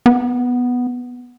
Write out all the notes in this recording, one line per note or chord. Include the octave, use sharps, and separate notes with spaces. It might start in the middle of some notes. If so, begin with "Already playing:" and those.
B3